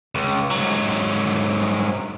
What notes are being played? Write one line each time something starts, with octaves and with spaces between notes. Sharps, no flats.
C#2
G#2 F#3